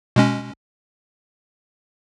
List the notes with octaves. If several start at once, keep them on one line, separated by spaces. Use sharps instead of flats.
B2 G#3 C#4